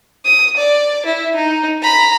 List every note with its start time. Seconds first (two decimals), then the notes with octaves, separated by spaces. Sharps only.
0.25 D#6
0.57 D5
1.06 E4
1.36 D#4
1.82 A#5 B5